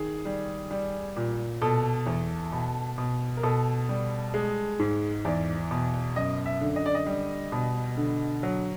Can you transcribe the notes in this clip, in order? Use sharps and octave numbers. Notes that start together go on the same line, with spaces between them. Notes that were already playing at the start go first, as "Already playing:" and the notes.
Already playing: D#3 G#4
G3
G3
A#2
B2 A4
E2
B2
B2
A#4
B2 A4
G3
G#3
G#2
E2 D5
B2
F#2 D#5
E5
D3
D#5
D5
D#5
G3
B2
D3
F#3